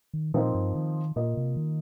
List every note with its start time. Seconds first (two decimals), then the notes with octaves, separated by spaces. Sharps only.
0.14 D#3
0.34 A#2 F3 C4 D#4 A#4 D#5
0.55 G2
0.75 D#3
1.16 A#2 A#3 F4 D#5
1.37 C3
1.56 D#3